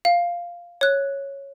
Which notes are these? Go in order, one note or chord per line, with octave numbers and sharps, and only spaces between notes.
F5
C#5 F#6